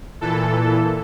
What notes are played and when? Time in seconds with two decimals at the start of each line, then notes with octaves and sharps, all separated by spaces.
0.21 A#2 E3 A4